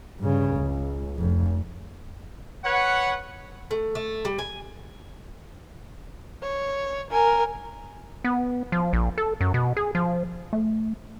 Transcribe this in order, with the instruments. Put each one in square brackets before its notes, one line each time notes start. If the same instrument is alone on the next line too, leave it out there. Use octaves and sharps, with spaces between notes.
[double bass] G2 C#3
C#2
F1 F2
[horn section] B4 C#5 F#5
[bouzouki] A3
A3
G3
G#5
[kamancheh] C#5
A#4 G#5
[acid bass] B3
F3
A#1
A4
F#2
B2
G#4
F3
A3